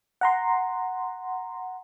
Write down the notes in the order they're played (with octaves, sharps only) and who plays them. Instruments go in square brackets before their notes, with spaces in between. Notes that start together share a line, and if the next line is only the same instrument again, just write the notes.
[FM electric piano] F#5 A#5 C6